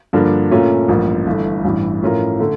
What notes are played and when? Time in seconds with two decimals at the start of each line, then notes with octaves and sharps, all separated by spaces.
0.13 G2 D3 F3 A#3 D4
0.51 A#2 A3 C#4 F4 A#4
0.88 A1 G2 F3 A#3
1.26 G1 G2 E3 A3
1.64 A1 G2 E3
2.02 A2 F3 C#4 F4 A#4
2.39 D3 A3